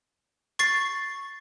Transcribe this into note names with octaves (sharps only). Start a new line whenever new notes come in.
C#6 A6 C7